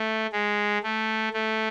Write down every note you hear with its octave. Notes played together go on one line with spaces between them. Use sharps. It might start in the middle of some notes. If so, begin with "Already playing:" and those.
Already playing: A3
G#3
A3
A3